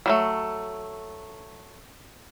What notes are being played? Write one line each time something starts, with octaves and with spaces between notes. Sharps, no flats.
F#3 G3 A3